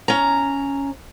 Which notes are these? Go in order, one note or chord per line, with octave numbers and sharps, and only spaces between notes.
C#4 A#5